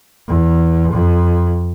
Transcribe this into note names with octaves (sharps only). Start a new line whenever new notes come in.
E2
F2